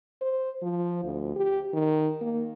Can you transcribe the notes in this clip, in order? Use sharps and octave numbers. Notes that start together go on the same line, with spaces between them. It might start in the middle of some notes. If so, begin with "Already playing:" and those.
C5
F3
D2
G4
D#3
A#3